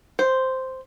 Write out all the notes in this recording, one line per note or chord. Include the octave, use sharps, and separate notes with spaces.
C5